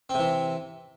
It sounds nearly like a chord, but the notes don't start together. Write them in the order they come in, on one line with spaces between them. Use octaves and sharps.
C4 C3 E3